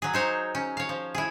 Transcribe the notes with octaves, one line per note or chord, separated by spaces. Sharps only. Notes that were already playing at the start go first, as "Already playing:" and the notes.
F#3 G#4
D#4 C5 C#5
C#4
C#5 F5
F3
E4 G#4